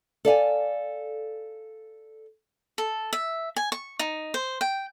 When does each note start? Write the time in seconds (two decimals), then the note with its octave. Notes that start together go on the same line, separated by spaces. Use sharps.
0.25 A4 D5 F5 G#5
2.78 A4
3.13 E5
3.56 G#5
3.72 C#6
3.99 D#4
4.34 C5
4.61 G5